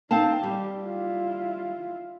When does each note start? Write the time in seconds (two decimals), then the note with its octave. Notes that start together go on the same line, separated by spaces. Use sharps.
0.11 C4 D#4 F5 A5
0.43 G3 G4
0.83 E4 F4